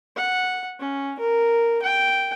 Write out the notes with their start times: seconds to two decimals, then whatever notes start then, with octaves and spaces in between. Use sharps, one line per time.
0.16 F#5
0.79 C#4
1.19 A#4
1.82 G5